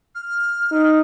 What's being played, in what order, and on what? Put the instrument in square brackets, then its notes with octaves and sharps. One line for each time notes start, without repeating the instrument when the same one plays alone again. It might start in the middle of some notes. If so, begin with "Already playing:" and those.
[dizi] F6
[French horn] D#4